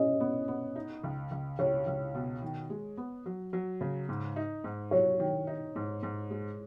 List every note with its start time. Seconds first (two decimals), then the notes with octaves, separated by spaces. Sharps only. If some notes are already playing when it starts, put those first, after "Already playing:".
Already playing: C#4 D#5
0.20 B3
0.48 B3
0.76 D#4
1.04 C#2
1.31 C#2
1.59 C#2 C#5
1.87 C#2
2.15 B2
2.42 D#3
2.70 G#3
2.97 B3
3.26 F#3
3.53 F#3
3.81 C#3
4.09 G#2
4.36 D#4
4.64 G#2
4.91 F#3 C#5
5.20 D#3
5.47 D#4
5.76 G#2
6.03 G#2
6.30 G#3